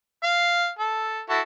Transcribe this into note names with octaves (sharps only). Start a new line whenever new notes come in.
F5
A4
E4 F#4 A4